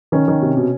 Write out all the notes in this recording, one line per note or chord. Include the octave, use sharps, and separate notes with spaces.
D#3 C#4
D#3
C3
B2